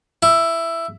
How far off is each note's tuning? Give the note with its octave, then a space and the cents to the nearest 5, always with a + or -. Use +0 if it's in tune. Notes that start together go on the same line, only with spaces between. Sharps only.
E4 +10